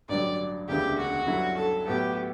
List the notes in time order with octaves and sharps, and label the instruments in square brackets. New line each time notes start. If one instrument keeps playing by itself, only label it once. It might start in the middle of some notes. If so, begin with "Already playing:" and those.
[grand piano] A1 G2 D3 F#3 [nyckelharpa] D5
[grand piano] E1 D2 C#3 E3 [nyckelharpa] G4
[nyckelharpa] F#4
[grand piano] G2 D3 F#3 C#4 E4
[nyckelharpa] A4
[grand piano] A2 F#3 B3 F#4 A4 [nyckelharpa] G4